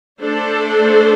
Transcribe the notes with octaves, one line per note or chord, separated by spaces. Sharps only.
A3 D4 A4 C5